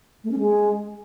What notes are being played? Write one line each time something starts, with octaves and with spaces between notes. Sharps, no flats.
A3
C#4
G#3